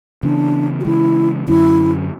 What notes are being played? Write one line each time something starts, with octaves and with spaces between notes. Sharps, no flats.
C#3 E3 B3 D4
F#4
C#3 E3 G#3 E4
F#2 D3 F#3 C#4 E4